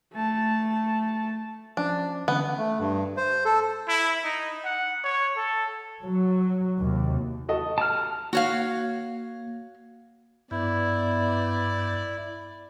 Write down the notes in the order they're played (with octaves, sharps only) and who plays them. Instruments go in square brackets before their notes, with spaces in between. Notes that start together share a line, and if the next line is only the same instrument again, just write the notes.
[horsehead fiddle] A3 A5
[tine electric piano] F3 C#4 C5 [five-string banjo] D4
[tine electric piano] D3 E3 C#4 [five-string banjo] B3
[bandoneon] A3
G2
C5
A4
[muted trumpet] E4
D#4
F#5
C#5
A4
[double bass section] F#3
D#2 C3
[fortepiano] F#4 A4 D#5
[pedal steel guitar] A5 F6
[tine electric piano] A#3 [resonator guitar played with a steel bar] F#4 C#5 F5
[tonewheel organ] G2 [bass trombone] B3 [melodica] E4 [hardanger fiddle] D5